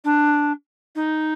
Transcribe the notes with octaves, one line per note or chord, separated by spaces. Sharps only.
D4
D#4